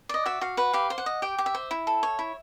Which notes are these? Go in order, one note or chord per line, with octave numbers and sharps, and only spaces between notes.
D5 D#5
F#4 E5
F#4 F5
B4 F#5
G4 F5
C5
F#5
D#5
G4 G5
G4
E5
C5
E4
A4
C#5
E4